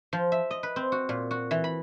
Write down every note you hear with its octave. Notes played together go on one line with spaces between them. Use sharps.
F3
E5
D#5
B4
C4
F#4
A#2
F#4
E3
B5